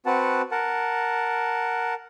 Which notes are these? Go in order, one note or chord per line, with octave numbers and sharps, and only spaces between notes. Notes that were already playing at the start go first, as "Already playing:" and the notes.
C4 F#4 B4 F#5 A5
A#4 F#5 A5